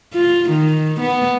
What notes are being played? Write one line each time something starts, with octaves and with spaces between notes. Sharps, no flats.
F4
D#3
B3